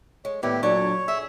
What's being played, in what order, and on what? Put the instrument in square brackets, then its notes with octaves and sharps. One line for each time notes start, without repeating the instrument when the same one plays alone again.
[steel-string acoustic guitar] G#3 [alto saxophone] C#5
[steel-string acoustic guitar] D#2 A2 G3 [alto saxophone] B3 [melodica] E4 G4
[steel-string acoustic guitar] D2 A#2 D4 [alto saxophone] F#3 [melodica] C#5
[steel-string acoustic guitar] G#4 [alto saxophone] E5